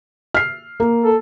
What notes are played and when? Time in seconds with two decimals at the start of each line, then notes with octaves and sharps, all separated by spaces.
0.35 F6 C7
0.80 A#3
1.05 A4